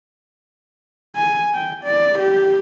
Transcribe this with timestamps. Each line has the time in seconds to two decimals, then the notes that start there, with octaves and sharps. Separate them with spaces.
1.16 G#5
1.54 G5
1.84 D5
2.19 G4